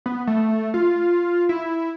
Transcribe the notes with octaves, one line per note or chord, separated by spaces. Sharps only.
B3
A3
F4
E4